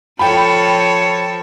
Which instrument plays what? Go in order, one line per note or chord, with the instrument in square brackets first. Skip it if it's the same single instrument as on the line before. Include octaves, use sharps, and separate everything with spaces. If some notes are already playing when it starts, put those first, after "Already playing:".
[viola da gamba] F3 A4 C#5 [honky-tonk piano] G5 B5